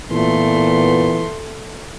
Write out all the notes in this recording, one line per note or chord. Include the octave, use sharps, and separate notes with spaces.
A#2 E3 A3 B3 C6